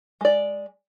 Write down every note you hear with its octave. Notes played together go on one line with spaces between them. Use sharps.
G#3 D5